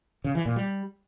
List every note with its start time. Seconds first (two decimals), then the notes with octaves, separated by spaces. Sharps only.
0.24 C#3
0.35 E3
0.46 A#2
0.56 G3